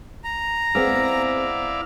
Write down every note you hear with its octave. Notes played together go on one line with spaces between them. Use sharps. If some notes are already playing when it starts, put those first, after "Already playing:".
A#5
B3 C4 E4 G#4 D5 F5